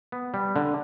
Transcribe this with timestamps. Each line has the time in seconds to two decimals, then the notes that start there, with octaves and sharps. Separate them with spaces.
0.12 B3
0.34 G3
0.56 D3